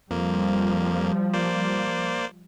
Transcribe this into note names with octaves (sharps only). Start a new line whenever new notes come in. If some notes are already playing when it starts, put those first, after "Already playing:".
F2 F3 G3 A#3
A#3 C5 D5